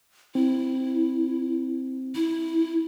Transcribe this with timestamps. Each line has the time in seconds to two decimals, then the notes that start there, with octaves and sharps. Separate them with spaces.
0.35 C4 E4
2.15 E4